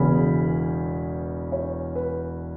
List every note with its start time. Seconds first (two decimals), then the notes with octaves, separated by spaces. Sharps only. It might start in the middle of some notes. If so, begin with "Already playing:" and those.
Already playing: E1 E2 C#3 B5
1.52 C#5
1.96 B4